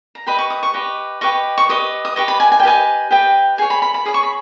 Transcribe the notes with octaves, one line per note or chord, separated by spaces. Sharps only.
A#5
G4 B4 D#5 B5
C#6
D#6
C#6
G4 B4 D#5
G4 B4 D#5 C#6
C#6
G4 B4 D#5 D#6
D#6
G4 B4 D#5 C#6
B5
G#5
G#5
G5
G4 B4 D#5 G#5
G4 B4 D#5 G5
G#4 C#5 G#5
B5
B5
B5
G#4 C#5 D#6
C#6
B5